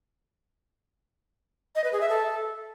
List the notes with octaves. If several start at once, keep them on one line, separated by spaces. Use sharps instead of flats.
D#5
B4
G#4
E5
A4